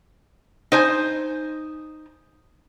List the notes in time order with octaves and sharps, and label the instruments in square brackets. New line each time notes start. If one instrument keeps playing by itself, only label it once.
[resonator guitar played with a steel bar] D#4 C5 G#5